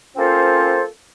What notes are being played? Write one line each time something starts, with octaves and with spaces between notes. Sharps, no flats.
A#3 C4 C#4 F4 A4 C5